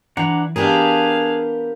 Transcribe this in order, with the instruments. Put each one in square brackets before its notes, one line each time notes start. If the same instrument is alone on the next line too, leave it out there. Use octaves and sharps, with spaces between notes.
[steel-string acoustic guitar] E3 [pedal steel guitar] D4 F#5 A#5
[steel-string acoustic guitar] B3 G4 A#4 [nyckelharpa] D4 F5 [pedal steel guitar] G#4